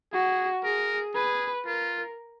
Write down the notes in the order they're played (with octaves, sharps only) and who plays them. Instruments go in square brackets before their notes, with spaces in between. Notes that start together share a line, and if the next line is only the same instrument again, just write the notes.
[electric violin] F#4 [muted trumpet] G#4
[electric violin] G#4 [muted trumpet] A#4
[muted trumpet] G#4 [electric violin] B4
[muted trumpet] F4 [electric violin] A#4